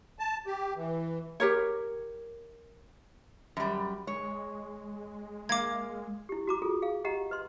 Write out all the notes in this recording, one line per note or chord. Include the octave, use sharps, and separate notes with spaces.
A5
G4
E3
G4 A#4 C#5
F#2 G3
G#3 C#5
A#3 F5 D6 G#6
E4 G4
F#4 A#5 D6
F4 G#4 A4
G#4 F5
G4 D#5 F#5 A#5
B4 D#5 C6